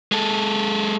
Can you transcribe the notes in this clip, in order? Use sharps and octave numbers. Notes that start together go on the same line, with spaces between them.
G#3 A4